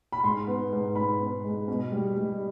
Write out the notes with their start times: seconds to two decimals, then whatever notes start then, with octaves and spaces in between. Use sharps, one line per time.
0.12 B5
0.24 G#2 C6
0.48 B3
0.73 G#2
0.96 G#2 B5
1.20 B3
1.44 G#3
1.68 B2
1.92 G3
2.16 G3